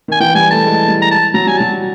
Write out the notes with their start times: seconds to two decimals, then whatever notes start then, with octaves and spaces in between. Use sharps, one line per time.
0.08 D#3 G#5
0.20 E3 G5
0.35 G3 G#5
0.51 A3 A5
0.66 G#3
0.88 G3
1.02 A#5
1.11 A5
1.34 F#3 A#5
1.47 G3 G#5
1.57 F#3 A5